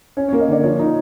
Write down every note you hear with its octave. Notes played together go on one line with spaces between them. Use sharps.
C#4 C#5
C#5
A#3
D#5
D3 D5
F3 C#5
D#4